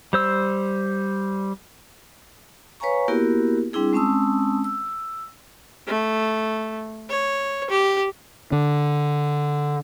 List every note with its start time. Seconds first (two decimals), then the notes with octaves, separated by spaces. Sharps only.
0.13 G3 C5 E6
2.80 B4 C#5 F5 G#5 A#5 C#6
3.08 A#3 B3 E4 F#4 G4 A#4
3.73 G3 C4 D4 E4 G#4
3.93 G#3 C4 C#4 A5 D#6 E6
4.64 E6
5.87 A3
7.09 C#5
7.70 G4
8.52 D3